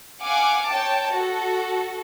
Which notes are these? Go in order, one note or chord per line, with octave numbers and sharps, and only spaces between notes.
F5 F#5 G#5 D6
C#5 G5 A5
F#4 A4